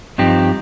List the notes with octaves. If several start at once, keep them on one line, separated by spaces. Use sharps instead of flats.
G2 F3 C4 D#4 G4